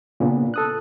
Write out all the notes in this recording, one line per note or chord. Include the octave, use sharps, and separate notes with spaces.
A#2 C#3 B3 D4
A4 D#6 F#6